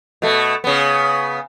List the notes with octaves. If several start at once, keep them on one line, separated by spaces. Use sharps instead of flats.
B2 A3
C#3 B3